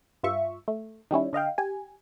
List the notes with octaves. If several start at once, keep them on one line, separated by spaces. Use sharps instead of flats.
G2 F4 E5 C#6
A3
D#3 G3 C#4 E4
D3 D#5 F5 G5
G4 G#5